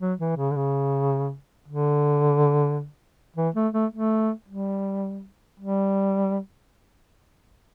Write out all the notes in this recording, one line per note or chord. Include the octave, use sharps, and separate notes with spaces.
F#3
E3
C#3
D3
C#3
D3
E3
A3
A3
A3
G3
G3